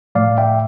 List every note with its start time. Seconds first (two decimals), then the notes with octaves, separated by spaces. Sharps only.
0.15 A2 F3 A3 D5 F5
0.38 E5 G5